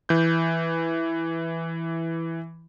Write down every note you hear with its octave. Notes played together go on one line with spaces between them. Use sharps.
E3 G6